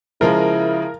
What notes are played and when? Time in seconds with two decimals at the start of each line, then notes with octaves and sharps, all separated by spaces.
0.21 C#3 F3 G#3 E4 A#4